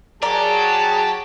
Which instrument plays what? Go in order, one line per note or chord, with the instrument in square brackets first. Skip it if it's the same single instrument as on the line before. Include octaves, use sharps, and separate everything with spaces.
[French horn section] F#3 G#4 [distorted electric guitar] G4 [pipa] A#4 D5 [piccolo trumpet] A5